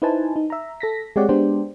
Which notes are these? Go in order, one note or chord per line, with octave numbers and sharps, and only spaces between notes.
D#4 E4 B4 C5 G#5 A5
D#4
E5 A#5
A4 A#6 B6
G#3 C4 G4 C#5 D5 F#5
G#3 B3 D4 G4 C5